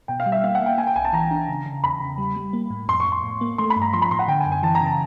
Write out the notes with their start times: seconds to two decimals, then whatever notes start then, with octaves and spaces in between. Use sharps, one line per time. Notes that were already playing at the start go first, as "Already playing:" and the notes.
0.08 B2 G5
0.20 F5
0.26 G3
0.32 E5
0.44 A#3 F5
0.55 F#5
0.61 A#3
0.66 G5
0.78 A#3 G#5
0.87 G5
0.96 B1 G#5
1.04 A5
1.13 E3 A#5
1.31 D4
1.48 C#3
1.66 C#3
1.84 E2 B5
2.00 C#3
2.18 G3
2.36 G3
2.53 A#3
2.70 A2
2.88 F2 C6
3.00 C#6
3.06 F2
3.12 C6
3.23 A2
3.41 A#3
3.58 A3 C6
3.70 B5
3.76 G2
3.82 A#5
3.93 F3 C6
4.02 B5
4.11 A2 C6
4.19 F#5
4.28 D3 G5
4.40 G#5
4.46 F#2
4.52 G#5
4.63 E3 A5
4.75 A#5
4.81 C#3 A5